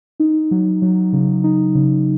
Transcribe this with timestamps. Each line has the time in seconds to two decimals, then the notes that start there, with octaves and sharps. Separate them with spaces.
0.20 D#4
0.51 F#3
0.82 F#3
1.13 C#3
1.44 D#4
1.75 C#3